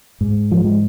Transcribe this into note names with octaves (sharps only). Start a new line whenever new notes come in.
G#2
F3
G#3